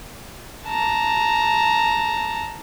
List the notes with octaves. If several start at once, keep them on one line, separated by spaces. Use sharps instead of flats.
A5 A#5